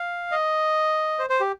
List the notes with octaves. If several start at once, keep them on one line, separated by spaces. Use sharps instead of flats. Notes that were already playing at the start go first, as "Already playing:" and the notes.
Already playing: F5
D#5
C5
C5
G4